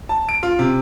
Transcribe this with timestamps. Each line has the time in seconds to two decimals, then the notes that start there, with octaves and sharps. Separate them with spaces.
0.09 A5
0.29 D7
0.43 F4
0.59 C3